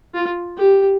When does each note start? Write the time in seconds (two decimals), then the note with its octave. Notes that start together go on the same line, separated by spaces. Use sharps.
0.14 F4
0.57 G4